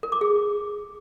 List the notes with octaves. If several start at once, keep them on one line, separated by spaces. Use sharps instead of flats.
A#4
D6
G#4